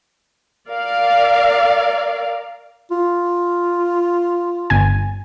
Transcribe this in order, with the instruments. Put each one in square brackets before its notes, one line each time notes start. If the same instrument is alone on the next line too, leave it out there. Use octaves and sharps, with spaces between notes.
[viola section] A#4 D5 F5
[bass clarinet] F4
[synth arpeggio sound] G1 G#5